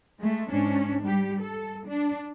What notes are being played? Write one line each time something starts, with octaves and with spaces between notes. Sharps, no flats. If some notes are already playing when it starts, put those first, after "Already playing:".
G#3 A3
G#2 C#4 D4
G3 G4
A4
D4